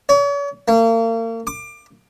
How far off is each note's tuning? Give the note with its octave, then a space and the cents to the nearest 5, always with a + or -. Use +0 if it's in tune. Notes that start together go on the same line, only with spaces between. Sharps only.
C#5 +40
A#3 -40
D6 +25